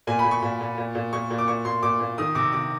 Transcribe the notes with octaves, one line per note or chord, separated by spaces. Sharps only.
A#2 G#5
B5
A#2
C#6
A#2
A#2
A#2
A#2
A#2 C#6
A#2
D6
A#2 C#6
A#2 C6
A#2 D6
A#2
D#3 D#6
C3 D6
C3 D6